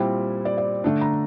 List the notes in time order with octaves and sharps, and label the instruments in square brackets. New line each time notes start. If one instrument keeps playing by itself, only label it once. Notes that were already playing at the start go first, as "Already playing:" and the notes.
Already playing: [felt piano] A#2 G3 C4 E4
D5
D5
D3 A3 D4
A#5